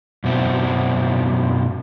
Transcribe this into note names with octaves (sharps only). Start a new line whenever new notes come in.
F#2 B2 C4 E4